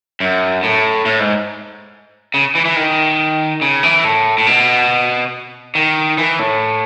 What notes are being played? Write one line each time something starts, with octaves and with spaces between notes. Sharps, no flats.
F#2
A2
A2
G#2
C#3
E3
E3
D#3
C#3
E3
A2
A2
B2
D#3
E3
A2